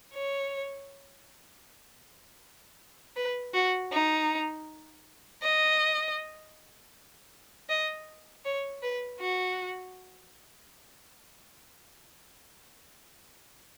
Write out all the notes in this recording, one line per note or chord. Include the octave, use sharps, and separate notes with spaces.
C#5
B4
F#4
D#4
D#5
D#5
C#5
B4
F#4